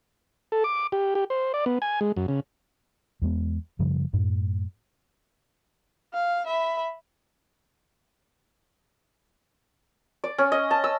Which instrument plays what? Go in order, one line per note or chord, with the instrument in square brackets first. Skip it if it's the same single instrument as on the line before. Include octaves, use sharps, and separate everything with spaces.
[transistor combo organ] A4
D6
G4
G4
C5
D5
B3
G#5
G#3
F#2
C#3
[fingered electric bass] E2 G#3 B3
F#2 C#3 F3 G3
F#2 A2
[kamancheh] F5
E5 B5
[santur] D5
C#4
D#5
A5
E6